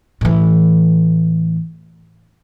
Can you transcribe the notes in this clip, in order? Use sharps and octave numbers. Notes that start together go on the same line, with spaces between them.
A2 E3